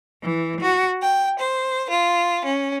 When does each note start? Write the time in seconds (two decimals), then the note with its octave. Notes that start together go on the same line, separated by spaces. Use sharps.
0.23 E3
0.62 F#4
1.01 G5
1.39 C5
1.89 F4
2.44 C#4